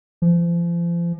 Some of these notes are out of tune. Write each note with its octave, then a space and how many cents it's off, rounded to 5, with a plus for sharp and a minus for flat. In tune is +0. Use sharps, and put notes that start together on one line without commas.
F3 -35